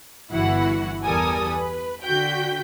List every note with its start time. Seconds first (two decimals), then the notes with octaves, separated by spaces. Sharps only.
0.32 G1 E3 E4 F#4 F#5
1.04 E2 G3 A4 A#4 G#5 D#6
1.48 B4
2.04 D3 F#4 G5 G6 B6